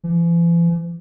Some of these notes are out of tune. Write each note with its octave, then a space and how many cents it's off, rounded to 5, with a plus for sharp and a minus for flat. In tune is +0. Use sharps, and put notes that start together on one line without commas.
E3 +45